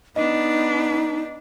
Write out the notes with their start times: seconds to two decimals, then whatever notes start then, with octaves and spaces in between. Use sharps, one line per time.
0.16 B3 D4 D#4 D#5